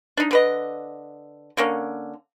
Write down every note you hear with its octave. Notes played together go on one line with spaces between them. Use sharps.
D4 D#4
D3 B4 D#5
D3 A#3 C#4